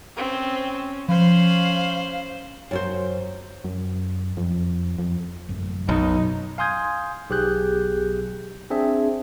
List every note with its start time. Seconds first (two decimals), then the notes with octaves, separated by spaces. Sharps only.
0.17 C4 C#4
1.09 F3 C#4 C5 F5 B5
2.71 F#2 F#4 C5
3.64 F#2
4.37 F2
4.99 F2
5.49 A1 F#2 A2
5.89 B1 D#4
6.58 F5 G#5 C6 D#6 G6 G#6
7.30 B1 G4 G#4 F#6 G6
8.70 C4 D4 G#4 E5